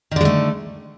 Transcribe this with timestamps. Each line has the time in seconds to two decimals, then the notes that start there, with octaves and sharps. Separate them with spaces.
0.11 D#3
0.16 D3
0.21 G#3
0.25 A3